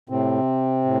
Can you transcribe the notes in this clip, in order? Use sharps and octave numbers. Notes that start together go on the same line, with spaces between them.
A2 C3 C4
A2